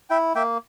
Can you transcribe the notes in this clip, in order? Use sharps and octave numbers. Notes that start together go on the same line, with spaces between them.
E4 E5 G5
A#3 E5 G5